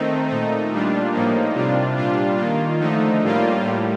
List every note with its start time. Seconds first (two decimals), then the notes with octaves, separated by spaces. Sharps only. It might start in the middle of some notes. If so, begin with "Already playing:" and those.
Already playing: D#3 A3 C4 D#4
0.29 A#2 A3 D#4
0.71 A#2 G3 D4 F4
1.13 A2 F3 A#3 D#4
1.55 C3 G3 D4 F4
1.96 A#2 G3 D4 F4
2.37 D#3 A#3 F4
2.79 D3 F3 A3 D#4
3.22 A2 G3 A#3 F4
3.63 A2 G3